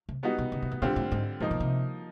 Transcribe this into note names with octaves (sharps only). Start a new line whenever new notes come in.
C3
G3 B3 D#4 F#4
B2
C#3
C3
B2
A#2 D3 G3 C4 F4
A2
G#2
A#2 F3 A#3 D#4
B2
C3